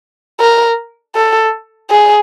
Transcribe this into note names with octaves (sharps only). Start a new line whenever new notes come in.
A#4
A4
G#4